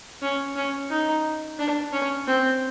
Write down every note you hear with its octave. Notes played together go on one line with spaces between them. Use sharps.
C#4
C#4
D#4
D4
C#4
C4